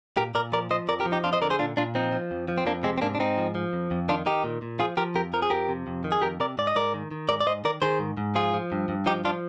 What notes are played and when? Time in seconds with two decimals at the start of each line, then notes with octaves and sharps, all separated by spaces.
0.17 A#2 G4 A#4
0.35 A#2 A#4 D5
0.52 F3 A#4 D5
0.70 F3 C5 D#5
0.88 F2 A#4 D5
1.00 G4 A#4
1.06 F3
1.12 D#4 G4
1.24 F2 D4 F4
1.33 C5 D#5
1.42 D3 A#4 D5
1.50 G#4 C5
1.59 A#2 D4 F4
1.77 A#2 D4 F4
1.95 F3 C4 D#4
2.12 F3
2.31 F2
2.48 F3
2.58 C4
2.66 F2 A#3 D4
2.83 C3 G#3 C4
2.98 C4
3.02 G#2 A#3 D4
3.15 D4
3.19 G#2 C4 D#4
3.38 F3
3.55 F3
3.73 F2
3.91 F2
4.09 D#3 D4 F4
4.26 D#3 D#4 G4
4.44 A#2
4.62 A#2
4.80 F3 F4 G#4
4.97 F3 G4 A#4
5.15 F2 G4 A#4
5.33 F3 A#4
5.42 G#4
5.50 F2 G4 A#4
5.69 C3
5.87 F2
6.04 D#3
6.12 G#4
6.22 F2 G4 A#4
6.40 C3 A#4 D5
6.58 G#2 D5
6.67 D#5
6.76 G#2 A#4 D5
6.94 D#3
7.11 D#3
7.29 G#2 A#4 D5
7.41 D5
7.46 G#2 C5 D#5
7.65 D#3 A#4 D5
7.82 D#3 G#4 C5
7.99 G#2
8.17 G#2
8.35 F3 F4 G#4
8.54 F3
8.72 G2
8.89 G2
9.06 F3 D#4 G4
9.25 F3 D4 F4